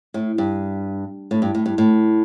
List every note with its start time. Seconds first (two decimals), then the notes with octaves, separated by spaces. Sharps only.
0.14 A2
0.38 G2
1.31 A2
1.42 G2
1.55 A2
1.66 G2
1.78 A2